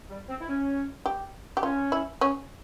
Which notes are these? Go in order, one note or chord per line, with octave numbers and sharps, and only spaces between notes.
G3
C4
E4
C#4
G4
G4
C#4 F4
E4
C#4